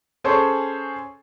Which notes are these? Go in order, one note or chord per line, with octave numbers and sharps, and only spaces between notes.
C#4 G#4 A4 C5 C#5